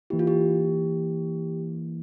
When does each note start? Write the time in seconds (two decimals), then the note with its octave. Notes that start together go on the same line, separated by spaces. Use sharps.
0.10 E3 A#3 E4 G4
0.19 F4
0.27 G4